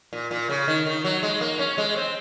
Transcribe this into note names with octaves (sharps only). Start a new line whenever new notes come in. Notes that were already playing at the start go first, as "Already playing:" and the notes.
A#2
A#2
C#3
D#3
D#3
F#3
G#3
A#3
C#4
G#3
C4